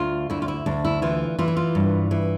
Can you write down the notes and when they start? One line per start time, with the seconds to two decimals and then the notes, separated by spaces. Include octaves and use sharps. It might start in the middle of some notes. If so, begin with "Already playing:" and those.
Already playing: D2 F4
0.30 D2 E4
0.42 F4
0.48 E4
0.66 D2 D4
0.85 E4
1.02 E3 F4
1.39 E3 F4
1.48 E4
1.57 F4
1.75 G2
2.11 E3